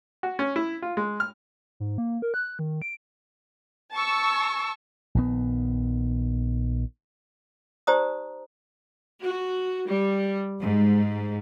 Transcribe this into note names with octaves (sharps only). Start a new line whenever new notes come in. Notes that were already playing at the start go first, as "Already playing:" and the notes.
F#4
C#4
E4
F4
G#3
F6
G#2
A#3
A#4
F#6
D#3
D7
A5 C#6 E6
A#1 D#3 B3
D#4 G4 C5 D5 A#5 D#6
F#4
G3
G#2